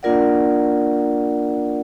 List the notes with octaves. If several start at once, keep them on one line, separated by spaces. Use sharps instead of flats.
A#3 D4 F4 A#4 D5 F#5